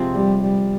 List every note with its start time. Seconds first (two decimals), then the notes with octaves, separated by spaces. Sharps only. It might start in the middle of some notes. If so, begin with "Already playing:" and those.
Already playing: C3 F3 G#3 C4
0.13 G3
0.43 G3